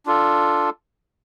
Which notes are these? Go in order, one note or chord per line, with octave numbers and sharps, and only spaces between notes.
D4 F4 A4